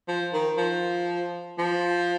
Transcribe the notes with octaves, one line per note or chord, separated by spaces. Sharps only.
F3
D#3
F3
F3